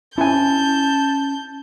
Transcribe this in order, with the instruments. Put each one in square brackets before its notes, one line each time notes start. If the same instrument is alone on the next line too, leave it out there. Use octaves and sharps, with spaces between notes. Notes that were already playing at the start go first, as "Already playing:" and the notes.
[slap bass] C#4 [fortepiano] E4 G#5 [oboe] A5 [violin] G6